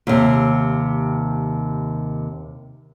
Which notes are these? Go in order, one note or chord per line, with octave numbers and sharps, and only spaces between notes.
D#2 C3